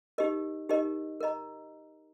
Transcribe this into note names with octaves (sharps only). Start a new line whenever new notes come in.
D#4 G4 A#4 D#5
D#4 G4 A#4 D#5
A#4 D#5 A#5